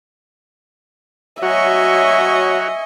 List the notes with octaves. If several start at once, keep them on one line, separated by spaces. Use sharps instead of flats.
F#3 F#4 C#5 D#5 E5 G#5 C#6